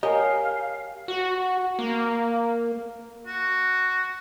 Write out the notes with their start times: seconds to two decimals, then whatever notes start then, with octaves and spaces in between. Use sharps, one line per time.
0.03 G4 A#4 C#5 D#5 F5 G5 G#5
1.08 F#4
1.79 A#3
3.27 F#4